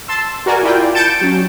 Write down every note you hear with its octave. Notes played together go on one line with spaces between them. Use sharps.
A5 C6 E6
F#4 A#4 D5 G#5
E4 F4 D5 G5
A5 G6 A6 C#7 D7 E7
F#3 C#4